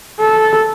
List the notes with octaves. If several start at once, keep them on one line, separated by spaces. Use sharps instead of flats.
A4